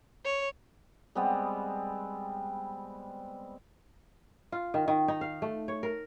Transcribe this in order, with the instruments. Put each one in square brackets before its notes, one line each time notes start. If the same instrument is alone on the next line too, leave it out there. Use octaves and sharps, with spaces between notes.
[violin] C#5
[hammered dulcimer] G3 G#3 B3 C4
[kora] F4
D#3
D#3
D#4
F5
A3
C#5
A#4